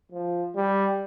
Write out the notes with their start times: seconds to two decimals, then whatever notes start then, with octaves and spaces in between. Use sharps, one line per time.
0.12 F3
0.55 G3